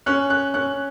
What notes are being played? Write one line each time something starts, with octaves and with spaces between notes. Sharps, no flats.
C#4 F#6
F#6
C#4 F#6